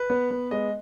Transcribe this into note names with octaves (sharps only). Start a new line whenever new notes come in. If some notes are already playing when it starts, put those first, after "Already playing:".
Already playing: B4
B3
B3
G#3 D#5